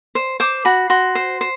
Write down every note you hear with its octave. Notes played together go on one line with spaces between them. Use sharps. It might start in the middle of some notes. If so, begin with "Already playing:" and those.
C5
C5 D6
F#4 B5
F#4 C6
C5
C5